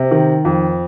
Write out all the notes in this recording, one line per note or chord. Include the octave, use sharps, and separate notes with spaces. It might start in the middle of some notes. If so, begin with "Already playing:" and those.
Already playing: C3
D#3
F2